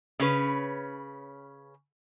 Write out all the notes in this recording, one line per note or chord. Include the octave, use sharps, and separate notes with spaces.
C#3 C#4 B4